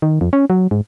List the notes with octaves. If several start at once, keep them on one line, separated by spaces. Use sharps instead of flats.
D#3
F2
C#4
F#3
G#2